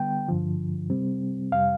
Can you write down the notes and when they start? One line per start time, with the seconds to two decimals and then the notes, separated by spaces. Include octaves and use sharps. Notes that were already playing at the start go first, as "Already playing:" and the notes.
Already playing: D3 G3 B3 G5
0.28 G2 D3 F3
0.90 C3 G3 C4
1.52 F2 C3 G3 F5